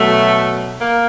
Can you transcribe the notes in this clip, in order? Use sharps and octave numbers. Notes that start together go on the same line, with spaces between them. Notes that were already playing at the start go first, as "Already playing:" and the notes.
Already playing: B2 F#3 A3
A#3